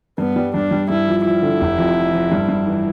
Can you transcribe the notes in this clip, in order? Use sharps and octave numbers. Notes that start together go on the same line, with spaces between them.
G2 B3
G3
G2 D4
G3
G2 E4
F3
F3 E4
D3
F1
F2
F3
F3
G2
G2
E3